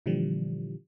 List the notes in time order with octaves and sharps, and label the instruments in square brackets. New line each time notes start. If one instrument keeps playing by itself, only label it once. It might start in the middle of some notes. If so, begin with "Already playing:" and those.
[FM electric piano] A#2 D3 E3 F3 G3